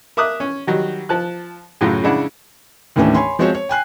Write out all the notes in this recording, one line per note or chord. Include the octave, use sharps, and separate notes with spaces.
A#4 E5 D6 D#6 F#6
C#4
D#3 F#3 G3
F3 A5 F#6
F#2 A2 C#3 F#3 F4
C#3 G#3 D4 E4 F#5
D#2 A2 E3 A3 C#4 D4
C#5 G#5 B5 C6
F3 G#3 C4 F#4 C5 C#5
C#5
G5 G#5 F#6 C7